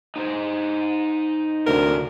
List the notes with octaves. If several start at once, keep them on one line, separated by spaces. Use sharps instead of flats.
D#4 C5 D#5
D2 A2 C3 A#4